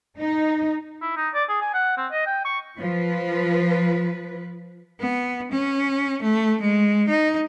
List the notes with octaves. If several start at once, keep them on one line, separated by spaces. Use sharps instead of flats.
D#4
E4
D#4
D5
G#4
G#5
F#5
C4
D#5
G5
C#6
F3 B4
B3
C#4
A3
G#3
D#4